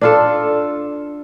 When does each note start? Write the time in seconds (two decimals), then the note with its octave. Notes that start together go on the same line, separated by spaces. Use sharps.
0.01 D4 F4 A4